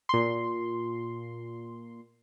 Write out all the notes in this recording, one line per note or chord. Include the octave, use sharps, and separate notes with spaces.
A#2 C6